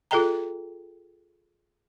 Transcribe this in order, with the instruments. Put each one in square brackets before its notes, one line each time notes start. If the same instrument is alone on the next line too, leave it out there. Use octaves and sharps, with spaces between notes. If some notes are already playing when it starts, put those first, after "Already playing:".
[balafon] F4 G#4 A4 D#5 G5 A#5